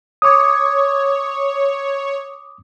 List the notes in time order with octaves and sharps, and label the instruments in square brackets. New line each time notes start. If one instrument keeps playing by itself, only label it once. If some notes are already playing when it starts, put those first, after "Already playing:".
[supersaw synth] C#5 [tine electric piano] D6 D#6